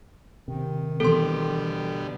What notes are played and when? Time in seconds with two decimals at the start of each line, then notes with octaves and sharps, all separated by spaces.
0.48 C3 D#3
1.00 B2 D3 E3 G3 B3 A4 C6